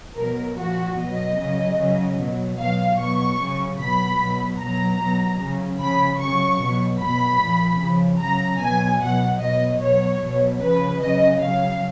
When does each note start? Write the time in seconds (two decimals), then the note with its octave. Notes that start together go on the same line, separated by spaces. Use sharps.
0.16 B2 F#3 A#4
0.56 A#2 F3 F#4
0.97 B2 F#3 D#5
1.38 C#3 F#3
1.77 C#3 F#3
2.18 B2 F#3
2.58 B2 F#3 F5
2.98 B2 F#3 C#6
3.38 C#3 F#3
3.78 B2 F#3 B5
4.17 B2 F#3
4.58 B2 F#3 A#5
4.98 B2 F#3
5.38 C#3 F#3
5.79 C#3 F3 B5
6.19 C#3 F#3 C#6
6.60 B2 F#3
6.99 B2 F#3 B5
7.40 A#2 F3
7.79 C#3 F3
8.19 C#3 F#3 A#5
8.59 B2 F#3 G#5
8.99 B2 F#3 F#5
9.40 B2 F#3 D#5
9.80 B2 F#3 C#5
10.20 B2 F#3
10.60 C#3 F3 B4
11.00 C#3 F#3 D#5
11.40 C#3 F#3 F5